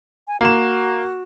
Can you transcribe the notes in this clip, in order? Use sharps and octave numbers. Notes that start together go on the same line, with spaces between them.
G#5
A#3 F#4 E7